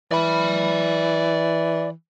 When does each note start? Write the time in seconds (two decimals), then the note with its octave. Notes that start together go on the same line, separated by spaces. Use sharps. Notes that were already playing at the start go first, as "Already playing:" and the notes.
0.11 E3 D5 B5